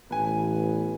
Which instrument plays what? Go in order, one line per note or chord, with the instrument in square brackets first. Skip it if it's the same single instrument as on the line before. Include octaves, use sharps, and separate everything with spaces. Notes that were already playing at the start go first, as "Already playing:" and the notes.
[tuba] A1 [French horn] B3 [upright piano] B4 G#5